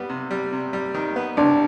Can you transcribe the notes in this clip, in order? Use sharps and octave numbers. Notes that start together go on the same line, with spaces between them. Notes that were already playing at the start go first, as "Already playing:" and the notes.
Already playing: G3 B3
C3
G3
C3
G3
D#3
B3
C2 D4